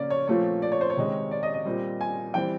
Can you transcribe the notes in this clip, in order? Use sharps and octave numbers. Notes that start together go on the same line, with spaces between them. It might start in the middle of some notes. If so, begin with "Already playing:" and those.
Already playing: C#3 A#3 C#4 D5
C#5
A#2 F3 A3 C4 C#5
D5
C#5
C5
C#5
C3 D#3 G#3 C4
D5
D#5
D#5
A#2 G3 C4
G#5
E3 G3 C4 G5